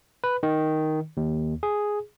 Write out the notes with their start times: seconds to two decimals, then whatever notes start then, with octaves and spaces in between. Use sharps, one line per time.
0.24 B4
0.43 D#3
1.17 D#2
1.63 G#4